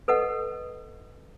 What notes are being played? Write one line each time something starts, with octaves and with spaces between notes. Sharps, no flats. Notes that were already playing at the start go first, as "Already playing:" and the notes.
A4 B4 D#5 F#5